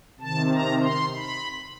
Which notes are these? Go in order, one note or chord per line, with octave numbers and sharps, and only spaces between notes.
C3 D#3 A5
A#5
C6
B5